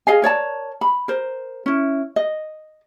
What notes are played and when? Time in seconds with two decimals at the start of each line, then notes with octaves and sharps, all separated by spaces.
0.07 G#4 D#5 F5 G#5
0.22 A#4 C#5 D5 A5
0.81 B5
1.08 A#4 C5
1.66 C#4 E4
2.16 D#5